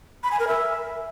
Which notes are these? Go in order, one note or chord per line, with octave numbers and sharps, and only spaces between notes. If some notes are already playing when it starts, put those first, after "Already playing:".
B5
G#5
A#4
E5